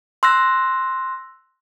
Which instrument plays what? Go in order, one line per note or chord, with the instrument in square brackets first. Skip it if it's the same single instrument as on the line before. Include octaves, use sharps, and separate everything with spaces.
[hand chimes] C6 E6 F#6 A#6